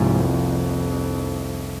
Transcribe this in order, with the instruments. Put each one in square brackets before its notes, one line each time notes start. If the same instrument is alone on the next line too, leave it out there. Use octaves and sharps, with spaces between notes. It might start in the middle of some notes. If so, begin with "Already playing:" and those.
Already playing: [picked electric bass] C2 C3 F3 [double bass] G#2
[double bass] F2